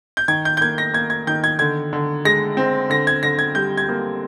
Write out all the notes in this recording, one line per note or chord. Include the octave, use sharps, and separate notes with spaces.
G6
D#3 G#6
G6
G6
A#3 G#6
A#6
A#3 G#6
G#6
D#3 G6
G#6
D3 G#6
D3
G#3 A#6
C4
D3 A#6
G#6
D3 A#6
G#6
G3 G6
G#6
A#3